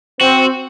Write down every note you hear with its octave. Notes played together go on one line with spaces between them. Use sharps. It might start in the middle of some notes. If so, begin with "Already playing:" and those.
C4 F#4